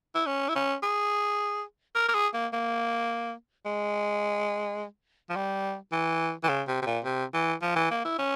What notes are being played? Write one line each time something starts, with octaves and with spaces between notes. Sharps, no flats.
E4
C#4
E4
C#4
G#4
A#4
A#4
G#4
A#3
A#3
G#3
F3
G3
E3
E3
C#3
C3
C3
A#2
C3
E3
F3
E3
A#3
E4
C#4